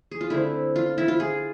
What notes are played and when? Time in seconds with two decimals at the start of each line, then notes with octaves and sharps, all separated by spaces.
0.11 G#4
0.21 F4
0.30 D3 A3 C4 E4
0.76 F4
0.98 E4
1.08 F4
1.20 G#4